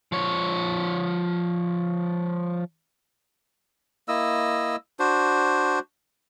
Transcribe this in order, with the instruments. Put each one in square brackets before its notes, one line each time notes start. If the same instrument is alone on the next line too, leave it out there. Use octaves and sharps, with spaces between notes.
[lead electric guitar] F3 C#5
[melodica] A#3 E4 D#5 E6
D4 F#4 C5